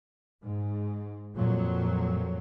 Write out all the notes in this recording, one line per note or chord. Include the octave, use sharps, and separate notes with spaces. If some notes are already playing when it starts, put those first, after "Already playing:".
G#2
F2 A#2 F#3